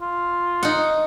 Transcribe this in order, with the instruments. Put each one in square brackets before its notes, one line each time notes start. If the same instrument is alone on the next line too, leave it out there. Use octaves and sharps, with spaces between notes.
[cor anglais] F4
[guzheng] D#4 F#5